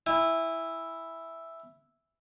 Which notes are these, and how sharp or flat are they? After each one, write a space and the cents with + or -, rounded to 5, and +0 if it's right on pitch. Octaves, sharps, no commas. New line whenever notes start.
E4 +0 G#5 -30